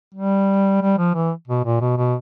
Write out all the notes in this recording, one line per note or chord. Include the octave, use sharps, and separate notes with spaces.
G3
G3
F3
E3
B2
A#2
B2
B2